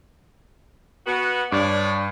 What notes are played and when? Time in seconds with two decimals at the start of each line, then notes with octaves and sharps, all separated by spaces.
1.06 B3 F#4
1.52 G2 D4 C#5 D5